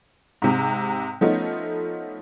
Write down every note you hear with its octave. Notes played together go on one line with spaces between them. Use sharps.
G#2 C3
F3 A3 B3 C#4 D#4 F4